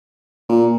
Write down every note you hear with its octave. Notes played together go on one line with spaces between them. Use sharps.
A#2